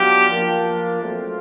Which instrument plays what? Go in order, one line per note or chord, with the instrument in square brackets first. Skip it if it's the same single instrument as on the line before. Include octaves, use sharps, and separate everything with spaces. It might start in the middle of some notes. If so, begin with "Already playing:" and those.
Already playing: [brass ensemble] F#3 B3 D4 F4 [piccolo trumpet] G4
[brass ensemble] F3 A#3 D4 F4
F#3 A3 C4 F4